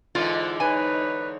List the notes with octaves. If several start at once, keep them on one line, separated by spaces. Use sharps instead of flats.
G#2 D3 E3 F4
D#4 B4 C#5 G#5